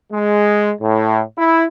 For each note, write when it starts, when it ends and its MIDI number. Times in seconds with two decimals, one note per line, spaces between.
0.12 0.72 56
0.81 1.21 45
1.37 1.65 64